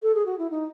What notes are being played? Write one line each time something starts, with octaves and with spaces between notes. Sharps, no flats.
A4
G#4
F#4
E4
D#4